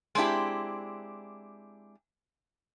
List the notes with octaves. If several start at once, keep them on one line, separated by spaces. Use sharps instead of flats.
G#3 C4 D4 E4 G4